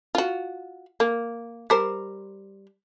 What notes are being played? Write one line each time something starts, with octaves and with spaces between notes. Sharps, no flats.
F4 F#4
A#3
G3 A#4 C5